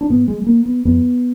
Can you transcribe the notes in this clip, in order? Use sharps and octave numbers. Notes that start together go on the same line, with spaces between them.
D4
G#2 B3
G#3
G#3
A#3
B3
F2 B3